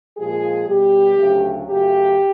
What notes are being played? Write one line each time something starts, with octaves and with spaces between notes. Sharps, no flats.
A#2 F3 G#3 G#4
B2 G3 G4
D2 C#3 F#3 A3
F#2 C#3 F#3 A3 G4